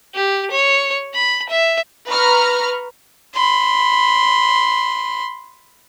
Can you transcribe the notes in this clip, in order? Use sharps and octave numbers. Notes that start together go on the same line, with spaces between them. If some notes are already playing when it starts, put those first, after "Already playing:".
G4
C#5
B5
E5
B4 A#5 C#6 F6
B5 C6